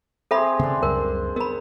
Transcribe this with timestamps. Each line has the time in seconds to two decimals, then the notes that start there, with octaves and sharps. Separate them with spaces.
0.31 C4 G#4 A4 E5 B5
0.59 C#3 B3 D4 C6
0.83 C#2 F#2 G3 A#4
1.36 B3 A#4 B5